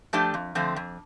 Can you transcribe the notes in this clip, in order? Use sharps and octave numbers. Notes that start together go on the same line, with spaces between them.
F3 A3 D4 G4
F2
D3 F3 A3 C4
F2